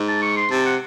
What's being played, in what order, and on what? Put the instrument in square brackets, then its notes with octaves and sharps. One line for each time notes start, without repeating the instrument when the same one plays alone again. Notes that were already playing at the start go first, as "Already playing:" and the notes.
Already playing: [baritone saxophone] G#2
[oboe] A5
C#6
C6
[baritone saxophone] C3 [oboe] A5
[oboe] F#5